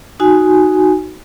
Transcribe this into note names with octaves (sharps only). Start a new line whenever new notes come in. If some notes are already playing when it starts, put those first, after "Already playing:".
D#4 F#4 G#5